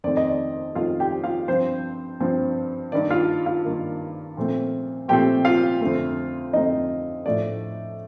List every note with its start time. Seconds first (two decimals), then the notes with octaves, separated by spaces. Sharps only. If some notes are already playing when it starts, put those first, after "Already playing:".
0.04 F2 D#3 A3 C4 D5
0.17 D#5
0.29 D5
0.75 F2 D#3 A3 C4 F4 F5
1.00 G4 G5
1.24 F4 F5
1.48 G2 F3 C4 C5
2.20 G2 F3 C4
2.92 G2 D#3 A#3 D5
3.10 F4 F5
3.46 F4 F5
3.65 G2 D#3 A#3
4.37 A#2 F3 A3 C4
5.08 A#2 F3 A3 C4 G4 G5
5.45 F4 F5
5.81 F2 D3 A3 C4
6.53 F2 D3 A3 C4 D#4 D#5
7.25 A2 F3 A3 D4 D5